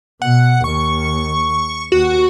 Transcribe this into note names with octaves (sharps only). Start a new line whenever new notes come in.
B2 F#5
D#2 C#6
D#2 F#4